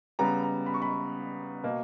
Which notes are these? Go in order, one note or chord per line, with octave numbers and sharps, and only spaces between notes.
C#3 G3 B3 A#5
A#5
B5
C#6
B5
C#6
B2 A#3